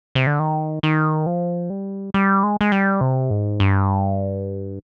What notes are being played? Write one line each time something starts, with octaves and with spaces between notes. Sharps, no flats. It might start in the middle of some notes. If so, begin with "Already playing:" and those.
C3
D3
D#3
D#3
F3
G3
G3
G#3
G#3
G3
C3
G#2
G2